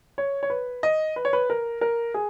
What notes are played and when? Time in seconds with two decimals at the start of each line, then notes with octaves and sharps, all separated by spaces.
0.18 C#5
0.43 C#5
0.50 B4
0.83 D#5
1.16 B4
1.25 C#5
1.33 B4
1.50 A#4
1.81 A#4
2.14 G#4